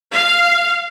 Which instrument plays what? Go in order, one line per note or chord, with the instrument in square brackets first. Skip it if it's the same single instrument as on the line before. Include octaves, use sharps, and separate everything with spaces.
[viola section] F5